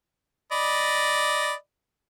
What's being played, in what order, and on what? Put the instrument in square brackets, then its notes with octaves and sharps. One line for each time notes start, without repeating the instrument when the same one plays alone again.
[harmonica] D5 D#5 B5